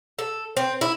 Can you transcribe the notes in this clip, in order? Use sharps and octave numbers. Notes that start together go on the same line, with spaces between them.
A4
C4
E4